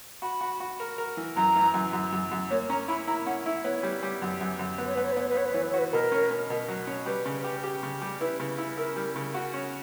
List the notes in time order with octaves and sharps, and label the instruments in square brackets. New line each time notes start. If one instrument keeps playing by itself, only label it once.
[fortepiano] F#4 [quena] B5
[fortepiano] F#4
F#4
A#4
A#4
E3
[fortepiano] F#2 [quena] A#5
[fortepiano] E3
F#2
F#2
F#2
F#2
[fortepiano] A#3 [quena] C#5
[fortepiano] C#4 [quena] A#5
[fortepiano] E4 [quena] B5
[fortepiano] E4 [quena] A#5
[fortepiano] C#4 [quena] F#5
[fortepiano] E4 [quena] E5
[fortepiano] B3 [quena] C#5
[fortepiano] G3
G3
F#2
F#2
F#2
[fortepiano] B3 [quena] B4
[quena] C#5
[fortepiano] B3 [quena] B4
[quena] C#5
B4
[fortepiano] B3 [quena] C#5
[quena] B4
[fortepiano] B3 [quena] C#5
[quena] B4
[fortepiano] E3 [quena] C#5
[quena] B4
[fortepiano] F#4 [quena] C#5
[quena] B4
[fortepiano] B2 [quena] A#4
[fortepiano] C#4
C#4
B2
F#3
C#4
[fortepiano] G3 [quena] B4
[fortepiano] C#3
G4
G4
C#3
G3
[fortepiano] E4 [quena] B4
[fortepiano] C#3
E4
[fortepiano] E4 [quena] A#4
[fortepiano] G3
C#3
F#4
C#4